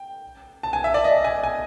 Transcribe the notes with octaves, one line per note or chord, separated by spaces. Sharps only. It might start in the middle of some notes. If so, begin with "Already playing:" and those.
Already playing: G5
A5
G#5
E5
D5
D#5
G#5
G#5